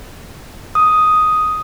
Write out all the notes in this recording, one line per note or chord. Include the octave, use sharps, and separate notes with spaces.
D#6